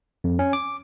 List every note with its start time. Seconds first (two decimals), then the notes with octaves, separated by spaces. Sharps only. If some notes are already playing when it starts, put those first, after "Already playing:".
0.24 F2
0.39 C#4
0.53 D6